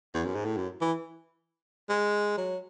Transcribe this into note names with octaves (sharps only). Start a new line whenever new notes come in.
E2
F#2
G#2
A2
F#2
E3
G#3
F#3